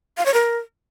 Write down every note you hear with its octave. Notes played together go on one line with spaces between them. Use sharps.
F5
C#5
A#4